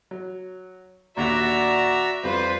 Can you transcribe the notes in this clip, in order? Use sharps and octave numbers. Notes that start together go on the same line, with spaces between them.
F#3
A#1 D#2 D3 F#4 D5 E5 A#5
F2 G3 F4 B4 C5